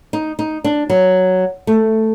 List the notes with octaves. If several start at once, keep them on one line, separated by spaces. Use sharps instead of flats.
D#4
D#4
D4
F#3
A3